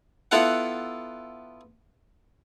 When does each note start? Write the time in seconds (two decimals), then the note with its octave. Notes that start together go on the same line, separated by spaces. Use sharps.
0.31 B3 E4 F4 A4 B4 F#5